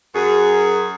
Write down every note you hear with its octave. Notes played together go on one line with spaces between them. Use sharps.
F#2 G#4